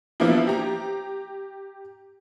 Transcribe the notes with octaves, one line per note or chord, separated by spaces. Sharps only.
F3 A#3 B3 D4 E4
G4 A#5